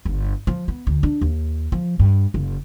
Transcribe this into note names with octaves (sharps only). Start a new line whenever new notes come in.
G1
F3
B3
D2
D4
D#2
F3
G2
F#1